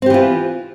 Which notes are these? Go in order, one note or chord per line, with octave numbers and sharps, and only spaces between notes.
E3 C4 F4 G4